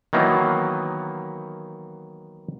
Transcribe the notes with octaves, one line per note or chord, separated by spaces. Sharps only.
D#3 E3 F#3 A#3 B3 D#4